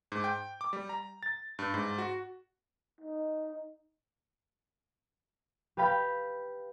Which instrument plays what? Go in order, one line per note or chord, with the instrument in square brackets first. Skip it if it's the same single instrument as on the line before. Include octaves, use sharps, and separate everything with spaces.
[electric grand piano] G#2
G5
D6
G3
A#5
A6
G2
G#2
F#4
[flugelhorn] D#4
[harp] G4 B4 F5 G5 B5